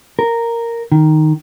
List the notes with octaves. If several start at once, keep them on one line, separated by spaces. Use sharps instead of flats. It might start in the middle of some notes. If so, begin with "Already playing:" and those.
A#4
D#3